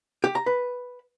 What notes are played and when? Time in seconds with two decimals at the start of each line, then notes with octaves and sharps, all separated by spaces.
0.24 G4
0.35 A#5
0.46 B4